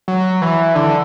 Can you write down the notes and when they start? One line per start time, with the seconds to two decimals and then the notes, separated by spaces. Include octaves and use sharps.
0.08 F#3
0.42 E3
0.75 D3